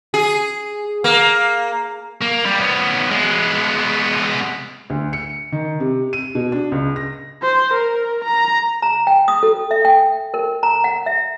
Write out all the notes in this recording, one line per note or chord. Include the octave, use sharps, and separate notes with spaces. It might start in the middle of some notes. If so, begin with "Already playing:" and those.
G#4
A#3
A#3
G3
B3 C#4
G#3 B3
D2
C#7
D#3
C3
D#7
B2
D4
C#2
A#6
C5
A#4
A#5
A#5
G5
D#6
A4
E5
G5
A#4
A#5
F#5
E5